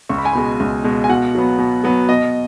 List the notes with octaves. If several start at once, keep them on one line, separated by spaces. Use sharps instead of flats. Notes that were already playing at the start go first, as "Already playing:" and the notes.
C#2 C#6
B5
G#5
B2 G#3 B5
C#2
B2 G#3
G#5
B2 F#5
F#3 B3
B2
F#3 B3
B2 D#5